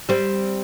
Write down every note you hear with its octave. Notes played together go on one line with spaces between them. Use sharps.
G3 C4